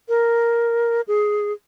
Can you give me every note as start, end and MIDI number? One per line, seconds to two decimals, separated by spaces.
0.09 1.01 70
1.08 1.53 68